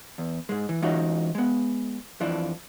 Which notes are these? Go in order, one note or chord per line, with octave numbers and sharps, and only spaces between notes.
E2
G#2 G#3
E3
E3 G#3 C#4 D#4 F4 F#4
G#3 B3
F2 E3 F3 D4